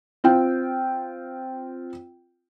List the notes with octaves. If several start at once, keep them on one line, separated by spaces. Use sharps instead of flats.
C4 F4 G5